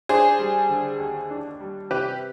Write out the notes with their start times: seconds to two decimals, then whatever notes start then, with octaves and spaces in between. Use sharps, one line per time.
0.09 D4 G#4 C5
0.39 G3
0.69 D3
0.99 D#2
1.30 D4
1.60 G3
1.90 C3 G4 B4